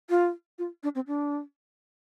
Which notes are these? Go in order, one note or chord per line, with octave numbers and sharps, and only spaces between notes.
F4
F4
D4
C4
D4